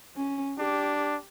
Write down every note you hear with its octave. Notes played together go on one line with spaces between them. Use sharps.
C#4
D4 G4